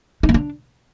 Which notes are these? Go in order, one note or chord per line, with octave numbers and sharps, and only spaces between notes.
D#4
A#3
D4